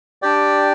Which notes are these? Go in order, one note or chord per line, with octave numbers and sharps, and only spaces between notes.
D4 G4 D5 G5